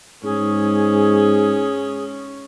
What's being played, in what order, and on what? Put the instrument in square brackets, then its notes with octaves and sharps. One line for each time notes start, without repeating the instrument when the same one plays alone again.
[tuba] G#2 [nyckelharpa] C#4 [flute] G#4